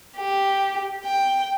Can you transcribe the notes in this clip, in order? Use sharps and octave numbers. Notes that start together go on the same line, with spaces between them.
G4
G5